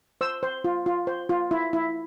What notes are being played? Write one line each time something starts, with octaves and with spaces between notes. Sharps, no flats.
C5 E6
C5
F4
F4
C5
F4
E4
E4